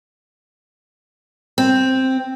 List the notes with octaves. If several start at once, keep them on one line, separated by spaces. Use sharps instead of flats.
C4